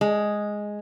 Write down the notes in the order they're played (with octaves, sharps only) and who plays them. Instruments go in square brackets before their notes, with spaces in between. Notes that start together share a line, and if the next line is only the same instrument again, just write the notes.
[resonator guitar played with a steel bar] G#3